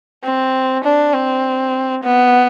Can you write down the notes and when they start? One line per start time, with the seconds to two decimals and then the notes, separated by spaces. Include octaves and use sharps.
0.23 C4
0.84 D4
1.14 C4
2.04 B3